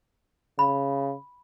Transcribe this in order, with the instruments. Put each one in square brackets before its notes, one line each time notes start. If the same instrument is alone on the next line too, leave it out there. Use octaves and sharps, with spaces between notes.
[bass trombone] C#3 [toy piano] B5